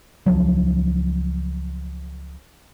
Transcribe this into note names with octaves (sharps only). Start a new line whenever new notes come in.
C#2 F3 F#3